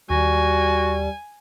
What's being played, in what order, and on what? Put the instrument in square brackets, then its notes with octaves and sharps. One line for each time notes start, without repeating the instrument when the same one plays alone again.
[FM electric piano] D#2 [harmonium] G3 [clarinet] F#4 [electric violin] G#5